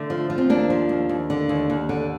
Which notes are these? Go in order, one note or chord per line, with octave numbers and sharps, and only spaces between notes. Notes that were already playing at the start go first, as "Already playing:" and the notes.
Already playing: D3 A3
F3
F3
C4
D#2 A#3 D4
F3
D#2
D#2
D3
D#2
D#2
D3